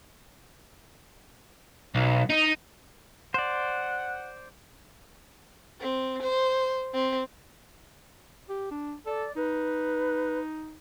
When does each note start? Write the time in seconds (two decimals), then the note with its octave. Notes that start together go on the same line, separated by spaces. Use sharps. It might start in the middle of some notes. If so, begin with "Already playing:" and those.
1.95 B1
2.30 D#4
3.34 C5 D5 F#5
5.80 C4
6.22 C5
6.93 C4
8.49 G4
8.71 D4
9.06 A4 D5
9.36 D#4 B4